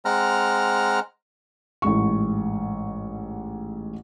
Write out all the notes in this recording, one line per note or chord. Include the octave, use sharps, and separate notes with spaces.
G#3 C4 F#5 A#5 F6
A1 G#2 C#6